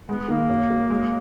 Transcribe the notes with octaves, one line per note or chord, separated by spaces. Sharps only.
G#3 B3
D#3 A#3
F#2
F#2
G#3